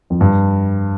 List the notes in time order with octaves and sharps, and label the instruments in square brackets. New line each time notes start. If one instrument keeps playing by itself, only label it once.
[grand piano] F2
G2